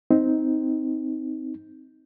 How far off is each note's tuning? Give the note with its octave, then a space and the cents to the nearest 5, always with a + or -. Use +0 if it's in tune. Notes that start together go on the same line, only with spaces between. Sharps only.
C4 -5 D#4 +10